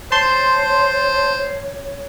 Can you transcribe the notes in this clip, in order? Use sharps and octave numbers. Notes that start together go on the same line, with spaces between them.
C5 C#5 A5 C6